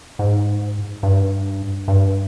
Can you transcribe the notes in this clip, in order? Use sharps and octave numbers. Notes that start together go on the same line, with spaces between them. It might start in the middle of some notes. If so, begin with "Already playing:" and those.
G#2
G2
G2